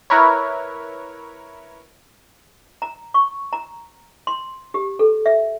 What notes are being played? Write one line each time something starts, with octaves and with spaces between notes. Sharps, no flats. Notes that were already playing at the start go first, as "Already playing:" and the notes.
E4 A#4 B4 C#5
A#5
C#6
A#5
C6
G4
A4
E5